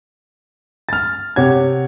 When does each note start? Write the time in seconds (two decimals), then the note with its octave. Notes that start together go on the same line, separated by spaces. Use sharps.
0.89 F6 A6
1.36 C3 G4 C#5 F#5 G#6